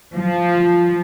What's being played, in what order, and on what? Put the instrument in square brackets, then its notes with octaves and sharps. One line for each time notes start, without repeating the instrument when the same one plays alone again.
[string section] F3